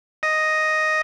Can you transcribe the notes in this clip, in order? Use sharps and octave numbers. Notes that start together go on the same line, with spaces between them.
D#5